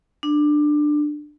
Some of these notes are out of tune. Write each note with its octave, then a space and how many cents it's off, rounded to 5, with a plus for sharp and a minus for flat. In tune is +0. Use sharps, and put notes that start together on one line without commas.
D4 +20